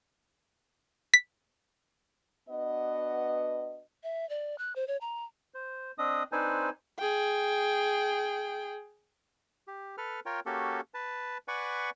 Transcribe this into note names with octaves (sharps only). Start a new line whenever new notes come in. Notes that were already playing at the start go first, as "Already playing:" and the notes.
B6
B3 D4 F#4 B4 D#5
E5
D5
F#6
C5
C#5
A#5
C5
C4 D4 D#5 D#6
C4 D4 D#4 B4 C5 G#5
G#4 G5
G4
A4 B4 F6
F4 A#4 C#5 G5
A#3 C#4 F#4 G4 A4
B4 A5
B4 D5 F#5 G#5 B5 C#6